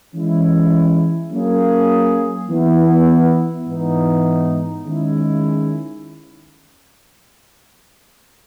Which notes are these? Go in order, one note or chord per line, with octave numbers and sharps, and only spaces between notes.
E3 G#3 C#4 E4
F#3 A#3 C#4 G#4
E3 B3 E4
G#2 E3 B3 D#4
D#3 G#3 C#4 E4